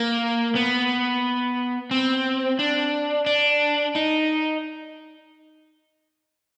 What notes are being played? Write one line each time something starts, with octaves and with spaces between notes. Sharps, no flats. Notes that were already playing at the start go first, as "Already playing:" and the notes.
Already playing: A#3
B3
C4
D4
D4
D#4